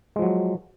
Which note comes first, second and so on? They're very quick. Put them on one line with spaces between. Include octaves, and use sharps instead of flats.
G#3 F3 F#3